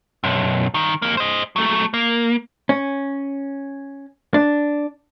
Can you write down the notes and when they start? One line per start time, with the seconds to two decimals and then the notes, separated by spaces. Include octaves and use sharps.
0.24 B1 F#2
0.74 G2 D#3
1.02 F2 A#3
1.17 C5 D#5
1.56 F#3 A3
1.94 A#3
2.69 C#4
4.34 D4